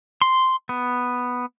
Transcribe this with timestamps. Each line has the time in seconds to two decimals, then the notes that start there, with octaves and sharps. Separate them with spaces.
0.22 C6
0.69 B3